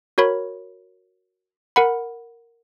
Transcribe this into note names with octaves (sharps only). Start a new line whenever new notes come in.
F#4 A#4 C#5 B5
A#4 F#5 B5